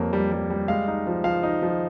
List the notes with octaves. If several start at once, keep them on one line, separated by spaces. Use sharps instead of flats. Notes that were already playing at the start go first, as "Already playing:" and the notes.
Already playing: F2 G3 A#3 C#5
G3
G3
G3
G#3 F5
D#4
F3
F3 F5
D#4
F3